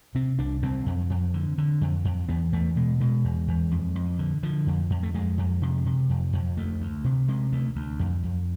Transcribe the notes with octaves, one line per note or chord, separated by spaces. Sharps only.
C3 C4
C2 D4
C2 C4
F2
F2
D3
D3
F2
F2
E2 B3
E2 A3
B2 G#3
B2 G#3
E2
E2
F2
F2
D3
D3 F3
F2
F2
A3
F2 G#3
F2
C3
C3
F2
F2
D2 A3
D2
C3
C3 G#3
D2 A3
D2
F2
F2